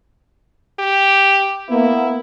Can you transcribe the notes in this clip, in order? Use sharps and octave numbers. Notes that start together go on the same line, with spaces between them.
G4
A#3 B3 E4